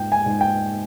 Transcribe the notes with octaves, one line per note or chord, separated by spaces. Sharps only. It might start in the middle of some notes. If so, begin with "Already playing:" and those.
Already playing: G#2 G5
G#5
G#2
G5